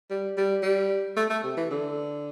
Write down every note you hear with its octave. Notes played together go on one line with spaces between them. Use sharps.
G3
G3
G3
A3
A3
C3
E3
D3